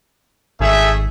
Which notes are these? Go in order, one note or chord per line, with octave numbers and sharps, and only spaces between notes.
G#1 A3 G#4 E5